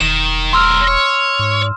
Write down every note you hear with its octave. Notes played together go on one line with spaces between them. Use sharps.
E1 D#3 E7
B1 A#4 C6 E6 F6
C#5
G#2